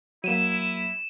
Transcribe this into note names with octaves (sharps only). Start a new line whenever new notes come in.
F#3 A#3 E4 D#7 E7